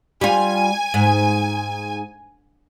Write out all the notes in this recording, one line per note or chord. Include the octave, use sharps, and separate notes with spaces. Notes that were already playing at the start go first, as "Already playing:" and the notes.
G3 F4 G#5
G#2